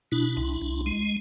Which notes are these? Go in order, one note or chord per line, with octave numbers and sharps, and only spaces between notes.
B2 D4 E4
C2
C2
G#3